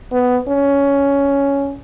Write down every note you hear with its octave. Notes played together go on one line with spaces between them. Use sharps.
B3
C#4